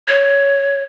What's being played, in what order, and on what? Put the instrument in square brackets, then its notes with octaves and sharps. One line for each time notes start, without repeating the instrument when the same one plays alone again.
[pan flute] C#5